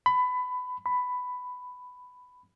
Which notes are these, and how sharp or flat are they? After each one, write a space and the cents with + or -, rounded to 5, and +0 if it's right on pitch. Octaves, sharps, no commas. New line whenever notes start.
B5 +20
B5 +10